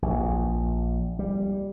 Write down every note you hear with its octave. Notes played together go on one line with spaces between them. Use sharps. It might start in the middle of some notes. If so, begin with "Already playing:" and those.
A#1
G3